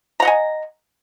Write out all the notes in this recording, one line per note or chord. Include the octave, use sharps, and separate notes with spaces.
D#5 F#5 G#5 A#5